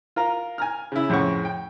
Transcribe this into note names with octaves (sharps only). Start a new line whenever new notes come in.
F4 A#4 A#5
G#5 A#5 F6
C#3 E4
F2 A2 C#3 F#5 C#6
G5